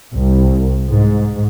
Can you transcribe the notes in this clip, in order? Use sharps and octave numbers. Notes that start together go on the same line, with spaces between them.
C2
G#2